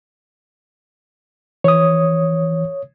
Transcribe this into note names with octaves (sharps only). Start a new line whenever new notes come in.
E3 C#5 D#6